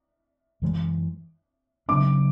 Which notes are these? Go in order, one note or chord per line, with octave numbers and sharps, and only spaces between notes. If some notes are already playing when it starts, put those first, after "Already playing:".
F#2 E3 G#3
C#3 F#3 B3 D4 D6